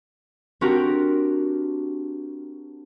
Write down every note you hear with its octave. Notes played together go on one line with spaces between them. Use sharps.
C4 D4 F#4 G4 A#4